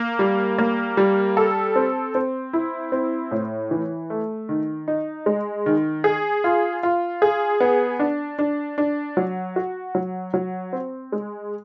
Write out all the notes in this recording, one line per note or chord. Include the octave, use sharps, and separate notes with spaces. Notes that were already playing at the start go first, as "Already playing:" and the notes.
Already playing: A#3
G3
A#3
G3
A4
C4
C4
E4
C4
A2
E3
A3
D#3
D#4
G#3
D#3
G#4
F4
F4
G#4
B3
D4
D4
D4
F#3
F#4
F#3
F#3
C4
G#3